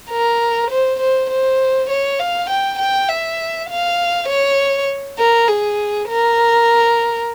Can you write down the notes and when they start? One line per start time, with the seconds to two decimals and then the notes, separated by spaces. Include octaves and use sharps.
0.10 A#4
0.70 C5
1.00 C5
1.30 C5
1.90 C#5
2.20 F5
2.50 G5
2.79 G5
3.08 E5
3.69 F5
4.29 C#5
5.18 A#4
5.48 G#4
6.08 A#4